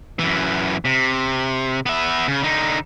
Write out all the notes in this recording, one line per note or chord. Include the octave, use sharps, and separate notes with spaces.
F#2 E3
C3
B3 E5
C#3
D3 D#4